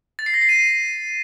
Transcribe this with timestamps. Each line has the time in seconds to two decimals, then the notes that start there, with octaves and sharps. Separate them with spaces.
0.19 A6
0.26 C7
0.34 A#6
0.41 C7
0.49 D#7